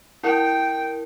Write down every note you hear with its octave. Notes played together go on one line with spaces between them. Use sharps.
E4 A#4 G5